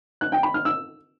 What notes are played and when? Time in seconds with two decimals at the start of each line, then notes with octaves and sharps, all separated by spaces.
0.21 F#6
0.32 G5
0.43 B5
0.54 F6
0.65 E6